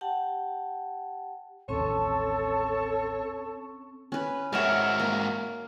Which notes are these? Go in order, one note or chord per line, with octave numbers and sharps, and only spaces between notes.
G4 F#5 G5 A5
A1 D#2 C4 C#4 A4 C#5 A5 C#6
C#4 B4
G#2 F#4 A#4 C#5 E5
A#3